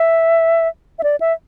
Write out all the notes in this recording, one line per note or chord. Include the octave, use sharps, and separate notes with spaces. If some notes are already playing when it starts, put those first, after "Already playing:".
Already playing: E5
E5
D5
E5